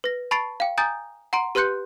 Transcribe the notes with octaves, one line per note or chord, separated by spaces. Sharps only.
B4 A#6
A5 B5 C#6 A6 C7 D7
F5 G5
G#5 A#5 D#6 G6 A6
F#5 A#5 C6 D7
G4 B4 C6 F#6 G6 C#7